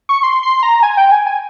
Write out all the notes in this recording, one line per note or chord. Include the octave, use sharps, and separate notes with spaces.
C#6
C6
C6
A#5
G#5
G5
G#5
G#5